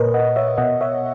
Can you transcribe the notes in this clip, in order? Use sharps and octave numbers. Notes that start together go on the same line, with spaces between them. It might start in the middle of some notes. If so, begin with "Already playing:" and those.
Already playing: A#2 A#4 B4 C#5 D#5
D#5 F#5
C#5 E5
B2 D#5 F#5
C#5 E5